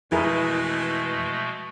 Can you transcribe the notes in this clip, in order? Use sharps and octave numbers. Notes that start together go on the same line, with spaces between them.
F2 B2 E3 G#3 A3 E4 G#4 A#4